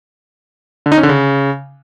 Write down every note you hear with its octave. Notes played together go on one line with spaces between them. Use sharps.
D3
D#4
C#4
D3
C#3